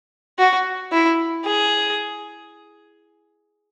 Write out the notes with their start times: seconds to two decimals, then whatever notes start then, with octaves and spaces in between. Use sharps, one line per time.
0.39 F#4
0.92 E4
1.45 G#4